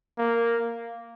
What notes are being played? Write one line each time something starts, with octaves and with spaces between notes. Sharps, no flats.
A#3